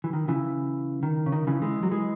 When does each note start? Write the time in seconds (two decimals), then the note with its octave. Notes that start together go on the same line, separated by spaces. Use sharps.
0.04 E3
0.13 D#3
0.28 C#3 E3
1.03 D#3
1.26 C#3
1.32 D#3
1.47 C#3 E3
1.62 E3 G#3
1.83 F#3
1.91 E3 G#3